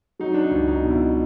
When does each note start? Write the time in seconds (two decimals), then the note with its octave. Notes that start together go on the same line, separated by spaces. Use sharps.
0.20 F#3 D#4
0.34 D4
0.44 D#4
0.51 C#2
0.68 D#4
0.83 B2
0.91 E4